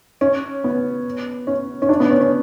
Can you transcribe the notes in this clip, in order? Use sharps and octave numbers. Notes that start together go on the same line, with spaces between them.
C#4
B3
C#4
C#4
D4
B3
C#4
C#4